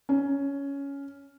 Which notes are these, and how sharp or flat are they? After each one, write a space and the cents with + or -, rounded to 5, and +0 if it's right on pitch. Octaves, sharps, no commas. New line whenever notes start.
C#4 +10